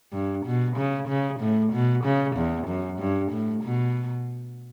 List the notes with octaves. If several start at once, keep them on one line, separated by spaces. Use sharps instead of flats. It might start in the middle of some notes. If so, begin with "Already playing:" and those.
G2
B2
C#3
C#3
A2
B2
C#3
E2
F#2
G2
A2
B2